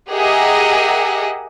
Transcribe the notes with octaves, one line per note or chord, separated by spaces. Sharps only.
G4 G#4 A#4 D#5 E5 F#5